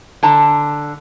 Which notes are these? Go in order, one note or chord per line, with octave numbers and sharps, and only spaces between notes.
D3 A5 A#5